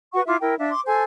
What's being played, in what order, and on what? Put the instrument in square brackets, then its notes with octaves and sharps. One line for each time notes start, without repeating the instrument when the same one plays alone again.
[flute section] F#4 B4 F#5 C#6
E4 F4 E5 D6
E4 A#4 G5
D4 E5 F5
C6 D6
A4 C5 G#5